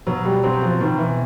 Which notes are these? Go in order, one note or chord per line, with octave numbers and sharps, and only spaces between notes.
B2 F#3
G3
F#3 C4
F3
B2 D#3
E3